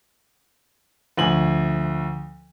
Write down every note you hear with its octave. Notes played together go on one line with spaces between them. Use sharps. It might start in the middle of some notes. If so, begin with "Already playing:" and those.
D2 F3 G#5 F#7